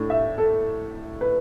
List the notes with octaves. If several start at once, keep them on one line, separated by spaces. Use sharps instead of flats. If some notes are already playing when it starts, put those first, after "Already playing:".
Already playing: A2 A3 D4
E5
A4
B4